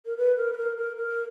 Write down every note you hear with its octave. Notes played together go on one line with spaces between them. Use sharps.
A#4
B4
A#4
B4
A#4
A#4
A#4